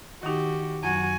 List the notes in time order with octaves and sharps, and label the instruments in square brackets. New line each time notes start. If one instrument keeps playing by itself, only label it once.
[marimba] D#3 D#4 [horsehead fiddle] F#4 G4
[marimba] F#2 F#3 [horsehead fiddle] F#4 G#5